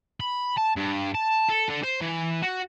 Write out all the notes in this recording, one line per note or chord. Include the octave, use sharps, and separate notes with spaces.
B5
A5
G2
A5
A4
D3
C5
E3
F#4